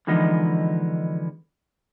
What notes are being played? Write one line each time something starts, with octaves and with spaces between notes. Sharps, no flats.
D3 E3 F3 G#3 B3 D#4